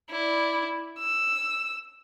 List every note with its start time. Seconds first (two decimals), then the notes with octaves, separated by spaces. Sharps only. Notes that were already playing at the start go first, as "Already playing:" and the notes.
0.11 E4 D5
0.99 E6